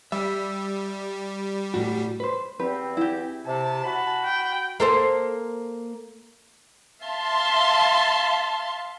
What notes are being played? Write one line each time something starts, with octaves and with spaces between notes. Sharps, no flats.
G3 E5
A2 F#4
B4 C5
E2 C4 G4 B4
E4 G4
C3 A5
F#4 B5
G5
A#3 A4 C5
E5 F5 A5 C6